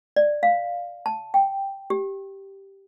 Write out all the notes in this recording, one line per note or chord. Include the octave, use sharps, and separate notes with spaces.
D5
F5
A5
G5
G4